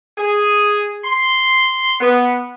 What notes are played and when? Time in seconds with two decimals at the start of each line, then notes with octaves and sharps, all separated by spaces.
0.18 G#4
1.04 C6
2.01 B3